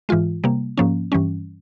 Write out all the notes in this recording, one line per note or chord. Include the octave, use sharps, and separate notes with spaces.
G#2 E3 G#3 F4
C3 G3 A#3
G#2 F3 A#3 C#4
G2 E3 G3 C#4